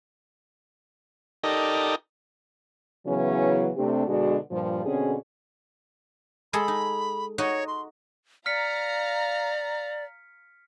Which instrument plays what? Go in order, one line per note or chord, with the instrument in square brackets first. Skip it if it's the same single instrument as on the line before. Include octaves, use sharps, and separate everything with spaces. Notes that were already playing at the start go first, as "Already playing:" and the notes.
[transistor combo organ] D#4 G4 A4 A#4 D5 D#5
[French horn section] C#3 E3 F#3 B3 C#4 E4
C3 A3 C4 D4 G4
B2 D3 G#3 D4 F#4
G2 A#2 F3
B2 D3 C4 C#4 G#4
[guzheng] G#3 G#4 A4 [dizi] B5
[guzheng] D#4
[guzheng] D#4 F#4 D#5 [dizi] C#5
[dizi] C6
[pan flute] D5 [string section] F5 A#5 [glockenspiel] F6 B6 C#7